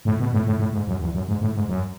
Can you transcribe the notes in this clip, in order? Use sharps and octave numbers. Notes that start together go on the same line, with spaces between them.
A2
B2
A2
A2
A2
G#2
F#2
E2
F#2
G#2
A2
G#2
F#2